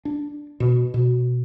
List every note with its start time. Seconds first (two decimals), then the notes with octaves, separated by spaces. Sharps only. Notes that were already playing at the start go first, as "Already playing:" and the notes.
0.05 D4
0.60 B2
0.94 B2